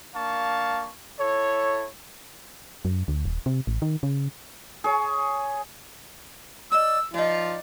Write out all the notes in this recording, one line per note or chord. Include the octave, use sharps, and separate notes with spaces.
A#3 D4 F5 A5 C#6
E4 A4 C#5
F#2
D2
D#1
C3
A1
D#3
C#3
G#4 C#5
D5 D#5 E6
F3 D#4 F4 D5